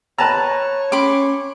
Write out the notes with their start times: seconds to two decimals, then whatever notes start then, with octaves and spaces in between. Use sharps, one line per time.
0.18 B4 C#5 A5 A#5
0.92 C#4 B5 C6 D6